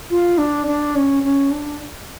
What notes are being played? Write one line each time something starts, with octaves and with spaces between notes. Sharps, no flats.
F4
D4
D4
C#4
C#4
D4